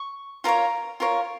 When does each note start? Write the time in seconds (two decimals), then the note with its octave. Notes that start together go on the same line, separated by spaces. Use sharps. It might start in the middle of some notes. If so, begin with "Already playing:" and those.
Already playing: C#6
0.44 F4 A#4 C#5 A#5
1.00 F4 A#4 C#5